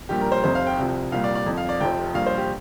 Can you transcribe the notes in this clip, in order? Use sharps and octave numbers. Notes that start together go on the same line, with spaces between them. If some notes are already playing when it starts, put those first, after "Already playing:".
A#1 A#2 G3 G4
A#4
C5
F1 F2 C3 C5
F5
G5
C2 C3 F3
C2 A#2 G3 F5
D5
D5
F2 F3
F5
D5
F1 F2 C3 F3 G5
A#1 A#2 G3 F5
C5
G4